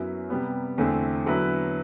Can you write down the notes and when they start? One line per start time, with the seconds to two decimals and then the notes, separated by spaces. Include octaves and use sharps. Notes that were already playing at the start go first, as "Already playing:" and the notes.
Already playing: F#2 F#3 B3 E4 B4
0.30 C3 G3 B3
0.78 E2 D3 A3 C4 E4
1.26 D3 F#3 B3 E4 B4